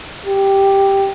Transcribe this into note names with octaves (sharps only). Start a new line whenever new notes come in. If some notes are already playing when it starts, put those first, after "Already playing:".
G4